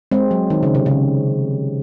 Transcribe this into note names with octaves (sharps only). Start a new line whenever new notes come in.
G#3 C4
F#3
D#3
C#3
C3
C#3